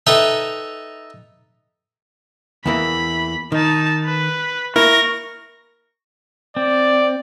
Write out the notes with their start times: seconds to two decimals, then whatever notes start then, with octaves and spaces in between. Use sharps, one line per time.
0.07 D#4 A4 B4 E5 G5 A#5
2.66 E2 E3 A#3 B5
3.52 D#3 D#4 A5
4.05 B4
4.76 A#3 E4 A#4 C#6 A#6
6.56 C4 D5